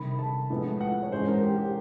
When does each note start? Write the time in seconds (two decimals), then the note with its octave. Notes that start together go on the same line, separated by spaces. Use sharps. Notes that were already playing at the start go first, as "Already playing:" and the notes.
Already playing: C3 D#3 G3 B5
0.19 A5
0.50 A2 F3 G#3 B3
0.81 F#5
1.03 C#5
1.11 G#2 E3 G#3 C#4 C5
1.28 A#4
1.43 G4
1.58 G4